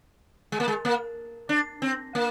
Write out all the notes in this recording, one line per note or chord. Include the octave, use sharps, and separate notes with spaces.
G#3
A#3
G#3
A#3
D4
C4
A#3